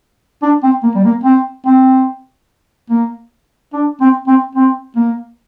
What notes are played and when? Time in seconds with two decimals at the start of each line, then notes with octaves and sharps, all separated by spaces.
0.42 D4
0.63 C4
0.83 A#3
0.95 G3
1.04 A#3
1.24 C4
1.66 C4
2.90 A#3
3.73 D4
4.01 C4
4.28 C4
4.55 C4
4.96 A#3